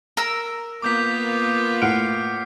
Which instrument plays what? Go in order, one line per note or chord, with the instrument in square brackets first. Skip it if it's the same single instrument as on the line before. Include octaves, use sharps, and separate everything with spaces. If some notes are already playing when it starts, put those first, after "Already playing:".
[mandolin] A#4 E6
[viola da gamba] A#3 B3 F4 [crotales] D6 G6 B6
[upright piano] A2 F#5 D7 [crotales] F6 C7